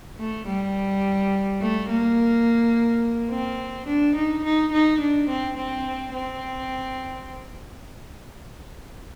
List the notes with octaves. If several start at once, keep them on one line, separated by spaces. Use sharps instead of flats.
A3
G3
A3
A#3
C4
D4
D#4
D#4
D#4
D4
C4
C4
C4